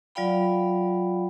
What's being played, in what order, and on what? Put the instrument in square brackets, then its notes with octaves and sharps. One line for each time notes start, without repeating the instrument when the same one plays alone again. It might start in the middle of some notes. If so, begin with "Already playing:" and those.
[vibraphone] F#3 F4 D5 F5 G5 B5